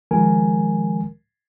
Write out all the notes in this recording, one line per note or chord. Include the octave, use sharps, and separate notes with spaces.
C#2 D#3 F3 G#3 A#4 G#5